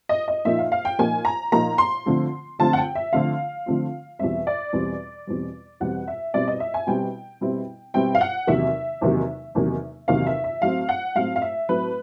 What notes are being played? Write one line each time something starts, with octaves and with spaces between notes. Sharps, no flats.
D#5
D#5
A#2 F3 A#3 D#4 E5
F5
F5
G5
A#2 F3 A#3 D#4 G#5
A#5
A#2 F3 A#3 D#4 A#5
C6
D3 F3 A3 C4 F4
D3 F3 A3 C4 F4 A5
F#5
G5
E5
D3 F3 A3 C4 F4 F5
D3 F3 A3 C4 F4
E2 B2 G3 C4 E5
D5
E2 B2 G3 C4
E2 B2 G3 C4
E2 B2 G3 C4 F#5
E5
B2 G3 C4 E4 D5
D#5
E5
G#5
B2 G3 C4 E4 G5
B2 G3 C4 E4
B2 G3 C4 E4 G5
F5
F#5
E2 C3 D#3 F#3 A#3 E5
E2 C3 D#3 F#3 A#3
E2 C3 D#3 F#3 A#3
E2 C3 D#3 F#3 A#3 F5
E5
E5
A2 F#3 A3 C4 F5
F#5
A2 F#3 A3 C4 F5
F5
E5
A2 F#3 A3 C4 B4